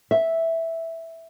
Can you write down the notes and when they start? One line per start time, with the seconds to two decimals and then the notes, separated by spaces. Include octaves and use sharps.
0.11 E5